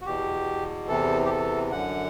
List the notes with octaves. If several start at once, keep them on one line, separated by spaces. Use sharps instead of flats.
F#4
E2 B2 G4
E2 C3 E3 A4
G4
A4
F#2 D3 F#5